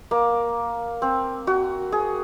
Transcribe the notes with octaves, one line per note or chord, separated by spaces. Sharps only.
A#3
C4
F#4
G#4